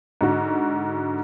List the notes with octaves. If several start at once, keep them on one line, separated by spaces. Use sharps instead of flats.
G#2 D3 F#4